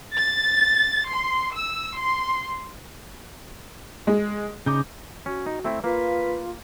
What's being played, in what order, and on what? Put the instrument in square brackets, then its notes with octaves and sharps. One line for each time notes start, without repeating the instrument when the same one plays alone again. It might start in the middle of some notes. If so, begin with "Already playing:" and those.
[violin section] A6
C6
E6
C6
[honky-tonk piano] G#3 G#4
[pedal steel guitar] C#3 D#4 D6 [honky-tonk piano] G6
[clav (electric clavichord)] C#4 [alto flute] F#4
[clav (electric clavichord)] D#4
A3 C4 E4
[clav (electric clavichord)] A#3 [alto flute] F4 [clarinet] B4